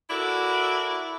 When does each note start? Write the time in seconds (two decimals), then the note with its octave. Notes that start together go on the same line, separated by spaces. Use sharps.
0.09 E4 F#4 A4 A#4 D5